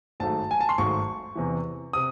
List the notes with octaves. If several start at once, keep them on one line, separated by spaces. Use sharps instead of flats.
G#1 G#2 F#3 A3 A5
G#5
A5
C6
G#1 G#2 F#3 A3 C#6
E2 C3 E3
C3 D#6